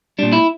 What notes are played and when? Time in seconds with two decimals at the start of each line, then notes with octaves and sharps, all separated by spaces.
0.19 A#2 G3 D4
0.32 E4